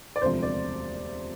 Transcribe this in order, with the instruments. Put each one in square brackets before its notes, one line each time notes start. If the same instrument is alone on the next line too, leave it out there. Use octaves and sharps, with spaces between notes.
[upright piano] D5
E1 D2 C3 F3 C5
D5